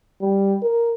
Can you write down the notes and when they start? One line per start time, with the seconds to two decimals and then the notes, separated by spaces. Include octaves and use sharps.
0.21 G3
0.62 A#4